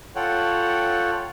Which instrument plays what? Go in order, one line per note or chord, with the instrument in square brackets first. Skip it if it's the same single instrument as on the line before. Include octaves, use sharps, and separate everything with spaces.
[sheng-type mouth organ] F4 A4 C#5 F#5 G5